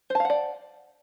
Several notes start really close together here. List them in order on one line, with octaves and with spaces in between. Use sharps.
C5 A5 F5 F#5 D5